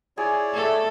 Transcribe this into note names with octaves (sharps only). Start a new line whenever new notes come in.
E4 G#4 C#5 D5
A3 A4